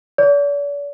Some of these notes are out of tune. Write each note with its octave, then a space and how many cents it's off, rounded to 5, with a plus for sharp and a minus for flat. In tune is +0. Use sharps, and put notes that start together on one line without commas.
D5 -45